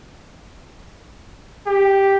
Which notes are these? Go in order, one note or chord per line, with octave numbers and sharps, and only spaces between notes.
G4